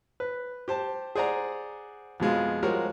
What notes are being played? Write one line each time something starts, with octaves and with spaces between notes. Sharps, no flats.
B4
G4 C5 A5
G#4 C5 D5 F#5 A#5
F2 B2 G#3 F4
F3 G3 G#3 F#4 A#4 C#5